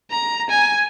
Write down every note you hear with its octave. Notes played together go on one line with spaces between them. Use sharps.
A#5
G#5